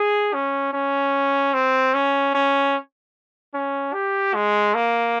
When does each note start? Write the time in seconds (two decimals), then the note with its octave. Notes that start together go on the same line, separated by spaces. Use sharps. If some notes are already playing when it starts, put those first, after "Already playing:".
Already playing: G#4
0.34 C#4
0.73 C#4
1.54 C4
1.94 C#4
2.34 C#4
3.54 C#4
3.93 G4
4.34 G#3
4.74 A#3